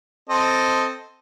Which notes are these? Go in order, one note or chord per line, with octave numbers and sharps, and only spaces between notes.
C4 A4 D#5